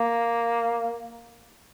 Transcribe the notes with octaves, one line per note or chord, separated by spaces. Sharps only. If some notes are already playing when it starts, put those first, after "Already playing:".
Already playing: A#3